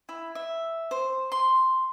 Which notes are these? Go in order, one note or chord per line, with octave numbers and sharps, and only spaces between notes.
E4
E5
C5
C6